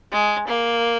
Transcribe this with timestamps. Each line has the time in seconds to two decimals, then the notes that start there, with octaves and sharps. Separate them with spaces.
0.12 G#3
0.48 A#3